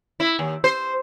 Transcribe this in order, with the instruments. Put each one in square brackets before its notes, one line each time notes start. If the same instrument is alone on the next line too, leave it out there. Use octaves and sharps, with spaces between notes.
[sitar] E4
D#2
C5